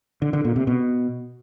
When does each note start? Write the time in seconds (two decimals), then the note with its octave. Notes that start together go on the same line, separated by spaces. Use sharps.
0.22 D3
0.33 D3
0.44 A#2
0.56 C3
0.67 B2